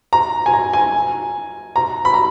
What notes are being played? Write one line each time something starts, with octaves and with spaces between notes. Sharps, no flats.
A#5
G#5
A#5
G#5
A#5
B5
A#5